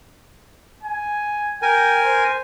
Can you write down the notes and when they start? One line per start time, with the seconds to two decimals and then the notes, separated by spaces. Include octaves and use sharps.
0.83 G#5
1.62 A#4 G5 G#5
2.03 C5